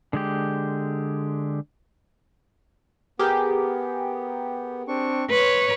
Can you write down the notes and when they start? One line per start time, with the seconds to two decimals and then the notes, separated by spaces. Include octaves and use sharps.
0.13 D3 G#3 G4
3.19 B3 G4 G#4 A#4
4.88 C4 D4 C#6
5.30 B4 C#5 C6